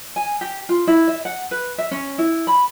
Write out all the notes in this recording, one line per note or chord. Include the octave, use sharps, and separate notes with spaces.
G#5
G4
F4
E4
E5
F#5
B4
E5
C#4
E4
B5